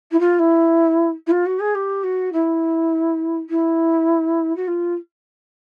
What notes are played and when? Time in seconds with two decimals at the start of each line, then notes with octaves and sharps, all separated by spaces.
0.11 E4
0.20 F4
0.39 E4
1.27 E4
1.31 F4
1.46 F#4
1.60 G#4
1.75 G4
2.03 F#4
2.33 E4
3.50 E4
4.56 F#4
4.67 F4